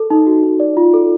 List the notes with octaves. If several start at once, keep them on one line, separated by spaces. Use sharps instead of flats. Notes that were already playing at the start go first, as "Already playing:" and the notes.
Already playing: A4
D#4
F#4
D#4
D5
F4
A4